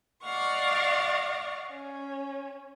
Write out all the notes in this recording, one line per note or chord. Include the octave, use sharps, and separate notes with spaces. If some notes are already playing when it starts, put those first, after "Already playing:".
D5 D#5 F5 F#5 C#6
C#4